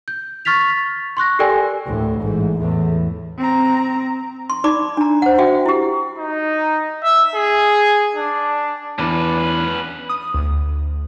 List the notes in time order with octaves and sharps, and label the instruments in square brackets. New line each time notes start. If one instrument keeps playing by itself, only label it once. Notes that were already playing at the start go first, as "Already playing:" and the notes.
[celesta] G6
C#6 F6 A6 B6 F7
C6 C#6 F#6 A#6
G4 A4 A#4 D5 G5 G#5
[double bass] D2 A2
A1 G#2
E2 A2
[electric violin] C4 A#5
[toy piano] C6
D#4 D5 B5 D6
D4 A#5
C5 F#5
F#4 E5 G5
E4 G4
[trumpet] D#4
E5
G#4
D4
[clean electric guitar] E2 D4 [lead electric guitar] C#4 B4
[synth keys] D#6
D2